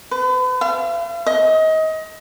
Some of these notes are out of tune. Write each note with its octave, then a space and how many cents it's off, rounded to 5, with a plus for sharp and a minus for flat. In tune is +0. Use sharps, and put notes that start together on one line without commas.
B4 +40
F5 -45
D#5 +25